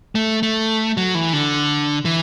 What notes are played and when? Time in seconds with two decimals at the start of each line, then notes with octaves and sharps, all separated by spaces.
0.15 A3
0.43 A3
0.97 F#3
1.15 E3
1.33 D3
2.05 E3